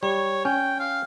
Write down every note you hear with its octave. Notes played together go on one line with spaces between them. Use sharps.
G3 C#5
C#4 G5
F5